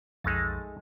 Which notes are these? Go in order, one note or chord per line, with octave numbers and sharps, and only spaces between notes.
B1 F2 G#3 A3 D#4 A6